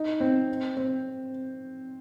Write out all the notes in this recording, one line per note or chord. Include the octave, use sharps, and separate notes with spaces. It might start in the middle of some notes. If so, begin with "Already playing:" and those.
Already playing: D#4
C4
C4